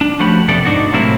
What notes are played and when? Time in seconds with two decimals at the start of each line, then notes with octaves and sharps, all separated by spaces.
0.01 D4
0.19 F3 A3 C#4 F#4 G4 B5
0.48 F2 C3 B3 A4 D5
0.65 G#2 B2 D4 D#4 F#4
0.93 A2 C3 F#3 A#3 C4 E4